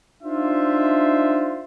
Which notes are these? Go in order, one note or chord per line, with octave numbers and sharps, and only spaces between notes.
D4 D#4 F4 C5 E5